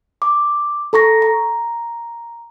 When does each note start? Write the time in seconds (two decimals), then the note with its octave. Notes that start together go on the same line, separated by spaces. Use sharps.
0.22 D6
0.93 A4 A#5 C#6 A#6
1.22 A#5